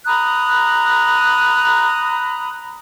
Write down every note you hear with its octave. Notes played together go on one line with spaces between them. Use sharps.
A#5 B5 D#6 F#6